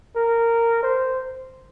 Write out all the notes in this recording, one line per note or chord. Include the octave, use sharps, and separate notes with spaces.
A#4
C5